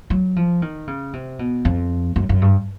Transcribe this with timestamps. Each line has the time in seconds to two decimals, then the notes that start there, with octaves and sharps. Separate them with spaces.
0.10 F#3
0.36 F3
0.62 D#3
0.87 C#3
1.13 C3
1.39 B2
1.65 F2
2.16 F#2
2.29 F#2
2.42 G2